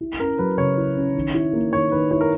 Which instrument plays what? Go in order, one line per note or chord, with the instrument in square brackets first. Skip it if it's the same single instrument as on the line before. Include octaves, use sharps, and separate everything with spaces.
[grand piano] E4
[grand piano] C#4 [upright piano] A#4
[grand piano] F#3 [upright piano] B4
[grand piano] C#3 [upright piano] C#5
[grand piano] E4
C#4
D#3
E4
A#3
[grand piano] D#3 [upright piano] C#5
[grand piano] D#3 [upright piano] B4
[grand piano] E4 [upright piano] C#5
[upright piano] A#4